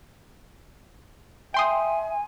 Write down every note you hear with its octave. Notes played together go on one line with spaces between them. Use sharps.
E5 G5 G#5 C6 D#6